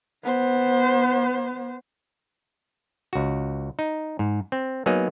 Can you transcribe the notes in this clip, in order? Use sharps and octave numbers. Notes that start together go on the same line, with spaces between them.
B3 C5
C#2 F#4
D#4
G#2
C4
F#3 A#3 B3 D#4 G#4